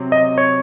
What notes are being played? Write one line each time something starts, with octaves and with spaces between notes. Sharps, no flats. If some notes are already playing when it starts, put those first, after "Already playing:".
Already playing: C3 F#3 C4
D#5
C#5